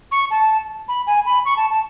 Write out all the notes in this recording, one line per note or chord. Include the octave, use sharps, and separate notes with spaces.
C#6
A5
B5
G#5
B5
C#6
A5
A5